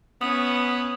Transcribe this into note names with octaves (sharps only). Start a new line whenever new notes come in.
B3 C#4 B4 D#6